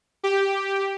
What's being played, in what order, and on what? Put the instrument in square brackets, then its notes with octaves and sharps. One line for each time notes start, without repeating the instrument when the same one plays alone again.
[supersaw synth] G4